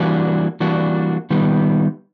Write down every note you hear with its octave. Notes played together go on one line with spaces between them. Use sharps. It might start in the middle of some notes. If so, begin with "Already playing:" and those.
Already playing: E3 G3 A#3 D4 F#4
E3 G3 A#3 D4 F#4
D#3 G3 B3